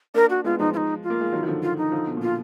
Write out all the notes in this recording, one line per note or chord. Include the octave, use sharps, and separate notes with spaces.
A#3 D4 A#4
F#4
G#3 B3 F4
F3 G#3 D#4
F4
D#4
F4
A#3
G#3
D#3 F#3
D#3
D3 F3
F4
D#4
D3 F3
B2
A#2
B2 F4